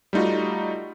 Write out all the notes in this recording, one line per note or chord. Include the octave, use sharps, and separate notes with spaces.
G3 A3 D#4 F4 F#4